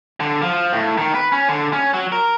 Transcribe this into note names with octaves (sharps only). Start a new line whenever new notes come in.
D3
F3
A2
D#3
B4
C#4
D3
C#4
F#3
A#4